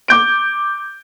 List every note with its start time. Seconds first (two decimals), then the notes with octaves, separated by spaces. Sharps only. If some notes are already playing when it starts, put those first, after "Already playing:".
0.08 D6 G6 D7